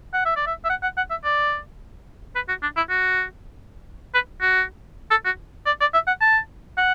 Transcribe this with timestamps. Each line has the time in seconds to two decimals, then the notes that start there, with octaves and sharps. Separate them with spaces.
0.14 F#5
0.25 E5
0.36 D5
0.46 E5
0.65 E5
0.70 F#5
0.83 F#5
0.97 F#5
1.10 E5
1.24 D5
2.35 B4
2.48 F#4
2.62 D4
2.77 E4
2.90 F#4
4.14 B4
4.41 F#4
5.11 A4
5.25 F#4
5.66 D5
5.81 D5
5.94 E5
6.07 F#5
6.21 A5
6.77 F#5